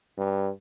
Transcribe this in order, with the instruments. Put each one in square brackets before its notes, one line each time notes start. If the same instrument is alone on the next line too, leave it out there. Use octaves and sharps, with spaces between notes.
[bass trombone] G2